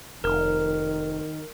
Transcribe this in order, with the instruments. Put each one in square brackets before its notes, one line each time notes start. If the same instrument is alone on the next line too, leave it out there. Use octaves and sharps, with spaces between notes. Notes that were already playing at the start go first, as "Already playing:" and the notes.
[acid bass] F1 [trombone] D#3 [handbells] A#4